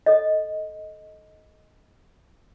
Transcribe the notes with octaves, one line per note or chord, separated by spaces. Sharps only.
A4 D#5